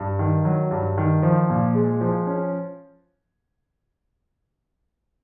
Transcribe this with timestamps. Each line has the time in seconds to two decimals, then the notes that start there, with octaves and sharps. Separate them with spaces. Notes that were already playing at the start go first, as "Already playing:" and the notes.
Already playing: G2
0.19 D#3
0.45 F#3
0.71 G2
0.98 D#3
1.23 F3
1.50 A#2
1.75 G#3
2.01 F3
2.27 C#4